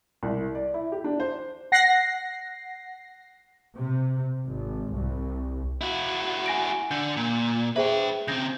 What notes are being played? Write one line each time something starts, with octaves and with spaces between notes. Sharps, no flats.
C2
D5
E4
G4
D4
C5
F#5 A#6 C7
C3
G#1
C2
E4 F#4
G#5 A#6 D7
D3 G6
A#2
G#4 B4 C5 E5 G5
C#3 C4 G6 A#6